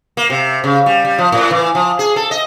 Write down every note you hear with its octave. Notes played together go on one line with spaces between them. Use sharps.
A#3
C3
C#3
G3
G3
F3
A2
E3
F3
G#4
A4
D#5